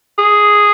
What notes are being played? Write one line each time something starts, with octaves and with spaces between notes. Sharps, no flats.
G#4